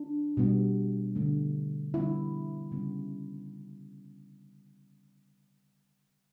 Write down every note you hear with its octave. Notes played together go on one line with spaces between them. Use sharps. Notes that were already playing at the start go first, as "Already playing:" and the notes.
Already playing: D4
B2 G3 B3
D3 A3
D3 G3 B3 E4
C#3 G3 B3